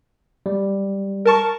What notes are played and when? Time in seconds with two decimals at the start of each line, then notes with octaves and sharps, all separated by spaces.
0.46 G3
1.25 A#4 A5 C#6